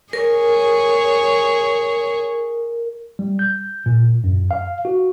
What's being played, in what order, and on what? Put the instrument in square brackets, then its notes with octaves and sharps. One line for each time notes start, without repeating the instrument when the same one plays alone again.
[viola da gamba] G#4 C#5 [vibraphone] A#4
[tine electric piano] G3
G6
A#2
F#2
F5
F#4